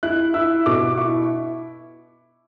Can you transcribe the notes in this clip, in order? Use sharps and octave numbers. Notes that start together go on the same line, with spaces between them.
E4 F#6
E4 E6
B2 D6
E4 C#6